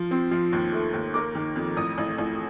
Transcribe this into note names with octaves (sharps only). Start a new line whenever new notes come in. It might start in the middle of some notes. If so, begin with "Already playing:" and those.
Already playing: F3
C4
F3
D#2
A3
D#2
A#3 D6
D#3
F2
A1 D#6
A1
A1